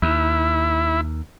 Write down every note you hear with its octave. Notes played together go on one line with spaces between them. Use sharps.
D#2 E4